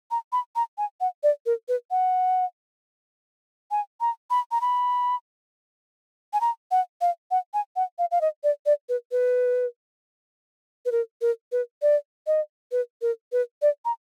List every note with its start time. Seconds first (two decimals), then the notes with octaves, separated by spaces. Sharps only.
0.11 A#5
0.32 B5
0.56 A#5
0.78 G#5
1.00 F#5
1.23 D5
1.46 A#4
1.68 B4
1.91 F#5
3.71 G#5
4.01 A#5
4.30 B5
4.51 A#5
4.61 B5
6.33 G#5
6.41 A#5
6.71 F#5
7.01 F5
7.31 F#5
7.54 G#5
7.76 F#5
7.98 F5
8.11 F5
8.21 D#5
8.43 D5
8.66 D5
8.89 B4
9.11 B4
10.85 B4
10.92 A#4
11.21 A#4
11.52 B4
11.82 D5
12.27 D#5
12.72 B4
13.02 A#4
13.32 B4
13.62 D5
13.85 A#5